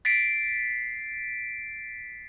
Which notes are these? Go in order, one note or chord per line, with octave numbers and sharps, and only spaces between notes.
A6 B6 C7 D7